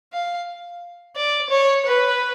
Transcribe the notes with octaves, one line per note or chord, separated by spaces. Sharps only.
F5
D5
C#5
B4